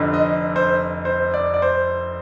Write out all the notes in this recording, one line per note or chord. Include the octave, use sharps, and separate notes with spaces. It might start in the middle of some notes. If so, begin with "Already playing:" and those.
Already playing: F1 F2 D3
D#5
C5
C5
D5
D5
C5